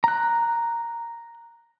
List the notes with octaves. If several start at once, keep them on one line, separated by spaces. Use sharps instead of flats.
A#5 F#6